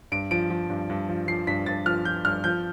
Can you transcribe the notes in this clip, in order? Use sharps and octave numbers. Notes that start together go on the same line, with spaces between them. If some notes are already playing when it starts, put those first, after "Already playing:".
G2 D7
F3 D7
F3
G2
G2
F3
F3 C7
G2 B6
G2 A6
F3 F6
F3 G6
G2 F6
F3 G6